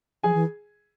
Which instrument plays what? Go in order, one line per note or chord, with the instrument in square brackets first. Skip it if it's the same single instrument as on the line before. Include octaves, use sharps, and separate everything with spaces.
[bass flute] F3 [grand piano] G#4 G#5
[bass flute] E3